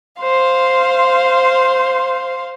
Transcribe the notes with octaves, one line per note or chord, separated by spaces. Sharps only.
C5 F5 C6